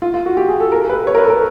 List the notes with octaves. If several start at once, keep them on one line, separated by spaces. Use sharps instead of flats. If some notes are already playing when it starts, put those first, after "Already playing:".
F4
F4
F#4
G4
G#4
A4
A#4
B4
C#5
A#4
B4
A4
A#4